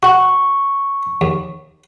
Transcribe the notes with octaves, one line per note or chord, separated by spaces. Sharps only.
F#4 F#5 C#6
D#2